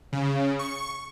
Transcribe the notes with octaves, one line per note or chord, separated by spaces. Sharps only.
C#3
C#6